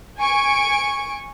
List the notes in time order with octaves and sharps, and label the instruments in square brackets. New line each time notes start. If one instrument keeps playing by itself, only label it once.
[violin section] G#5 C#6 D7